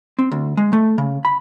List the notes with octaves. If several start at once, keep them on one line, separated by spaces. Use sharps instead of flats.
C4
D2
G#3
A3
C#3
B5